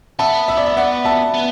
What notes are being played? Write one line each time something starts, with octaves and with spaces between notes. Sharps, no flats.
B3 E5 A5
E5
D5
E5
D5 F#5
E5 A5
B3